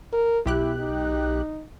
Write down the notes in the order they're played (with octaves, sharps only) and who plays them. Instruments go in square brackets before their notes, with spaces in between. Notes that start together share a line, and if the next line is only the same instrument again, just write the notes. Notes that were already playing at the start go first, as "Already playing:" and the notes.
[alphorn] A#4
[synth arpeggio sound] B1 G4 F#6 [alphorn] E4
[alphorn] D#4